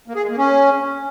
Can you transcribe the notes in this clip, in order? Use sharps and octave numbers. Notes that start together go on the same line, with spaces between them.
A#3
G#4
G#3
A#3
C#4